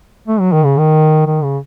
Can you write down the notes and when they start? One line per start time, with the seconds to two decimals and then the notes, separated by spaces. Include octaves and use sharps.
0.28 A3
0.40 F#3
0.52 D#3
0.65 C#3
0.77 D#3
1.26 D#3
1.43 C#3